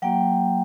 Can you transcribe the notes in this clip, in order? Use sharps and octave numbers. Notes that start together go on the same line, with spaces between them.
F#3 A#3 F#4 G5